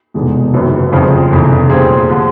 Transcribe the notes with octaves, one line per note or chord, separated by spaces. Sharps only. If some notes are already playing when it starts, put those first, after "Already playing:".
F1 E2 B2 G#3
F#1 F#2 D#3 F#3 B3
G1 F2 C#3 F3
F1 E2 C#3
A#2 G3 C4 F4 G#4
D3 F3